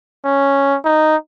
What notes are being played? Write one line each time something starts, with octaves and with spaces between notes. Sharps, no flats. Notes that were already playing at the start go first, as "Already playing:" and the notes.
C#4
D#4